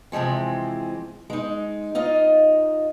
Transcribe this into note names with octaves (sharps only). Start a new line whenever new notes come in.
C3 E3 F3 G#3 C4
G#3 D#4
D#4 F4 D#5